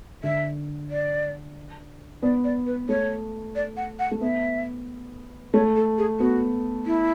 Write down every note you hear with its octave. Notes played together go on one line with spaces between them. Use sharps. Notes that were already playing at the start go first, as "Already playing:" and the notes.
D3 E5
D5
B3 D5
D5
B4
A3 C#5
D5
F#5
F#5
A3
B3 E5
A3 C#5
A4
G#4
B3 F#4
E4